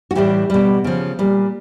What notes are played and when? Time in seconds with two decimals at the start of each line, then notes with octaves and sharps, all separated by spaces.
0.11 F#4
0.15 A2 E3 G3 G4
0.50 B2 G3
0.84 C#3 F3
1.19 A#2 G3